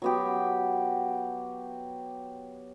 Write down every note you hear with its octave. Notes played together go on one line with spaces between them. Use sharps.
F#3 B3 G4